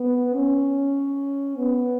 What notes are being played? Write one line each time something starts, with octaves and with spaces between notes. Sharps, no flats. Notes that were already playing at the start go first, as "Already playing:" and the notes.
Already playing: B3
C#4
B3